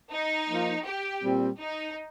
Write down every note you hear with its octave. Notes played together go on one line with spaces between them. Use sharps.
D#4
F3 A#3 F4
G4
A#2 G3 C4
D#4